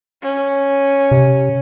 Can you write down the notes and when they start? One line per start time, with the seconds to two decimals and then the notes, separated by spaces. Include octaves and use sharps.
0.22 C#4
1.11 C3